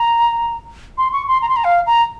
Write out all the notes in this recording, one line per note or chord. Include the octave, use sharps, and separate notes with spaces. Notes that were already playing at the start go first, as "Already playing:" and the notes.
Already playing: A#5
C6
C#6
C6
A#5
C6
A#5
F5
A#5